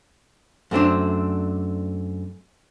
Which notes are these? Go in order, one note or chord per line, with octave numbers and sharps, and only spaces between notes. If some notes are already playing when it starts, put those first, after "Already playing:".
F#2 A3 C4 D4